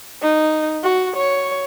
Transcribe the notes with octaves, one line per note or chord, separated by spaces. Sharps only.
D#4
F#4
C#5